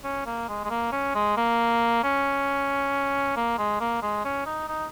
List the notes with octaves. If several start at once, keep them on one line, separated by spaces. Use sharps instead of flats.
C#4
A#3
G#3
G#3
A#3
C#4
G#3
A#3
C#4
A#3
G#3
A#3
G#3
C#4
D#4
D#4